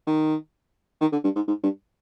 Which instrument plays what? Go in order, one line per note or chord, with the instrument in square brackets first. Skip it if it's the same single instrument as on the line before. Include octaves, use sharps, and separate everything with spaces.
[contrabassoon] D#3
D#3
D3
G2
G#2
G#2
G2